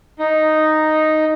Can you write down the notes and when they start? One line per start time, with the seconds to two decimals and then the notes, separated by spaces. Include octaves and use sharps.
0.19 D#4